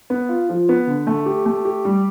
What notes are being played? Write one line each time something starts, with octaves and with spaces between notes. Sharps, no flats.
B3
F4
F3
B3
D3
A3
G4
A3
G4
G3